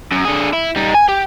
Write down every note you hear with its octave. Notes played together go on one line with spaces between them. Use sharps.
F#2
D3 G#4
E4
G3 D#4
G#5
G4